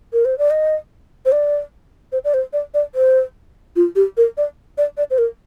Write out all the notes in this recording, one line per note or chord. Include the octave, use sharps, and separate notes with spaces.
A#4
C5
D5
D#5
C5
D5
C5
D5
C5
D5
D5
C5
F4
G4
A#4
D5
D5
D5
C5
A#4